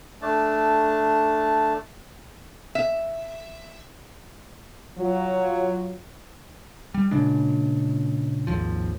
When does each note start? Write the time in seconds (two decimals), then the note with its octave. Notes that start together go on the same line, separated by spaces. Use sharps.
0.22 A3 D4 A5
2.75 E5
4.99 F#3 F4
6.94 G3
7.11 A#2 C#3 G#3 D4
8.47 G#1 D#2 F3